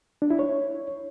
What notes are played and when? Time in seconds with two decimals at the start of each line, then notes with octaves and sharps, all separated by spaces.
0.22 D4
0.30 E4
0.39 C#5